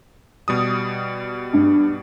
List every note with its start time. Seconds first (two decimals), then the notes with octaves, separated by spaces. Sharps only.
0.48 B2 G3 D#6
1.53 G2